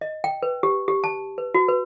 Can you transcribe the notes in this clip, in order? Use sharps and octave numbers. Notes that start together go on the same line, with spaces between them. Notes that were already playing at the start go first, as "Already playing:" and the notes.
D#5
G5
B4
G4
G4
A5
B4
F#4
B4